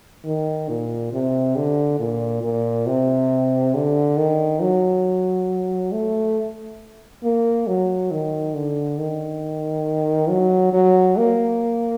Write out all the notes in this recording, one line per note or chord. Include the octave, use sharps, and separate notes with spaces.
D#3
A#2
C3
D3
A#2
A#2
C3
D3
D#3
F#3
A3
A#3
F#3
D#3
D3
D#3
F#3
F#3
A#3